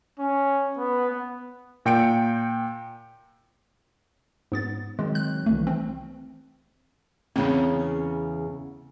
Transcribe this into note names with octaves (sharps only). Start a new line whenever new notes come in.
C#4
B3
A#2 G5 C#7 D7
G#2 B3 A6
D#3 F#3 G#3 C4
F#6
C2 E3 A3
C4
E2 C#3 C4